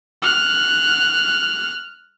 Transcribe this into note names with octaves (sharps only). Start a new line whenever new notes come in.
F6 F#6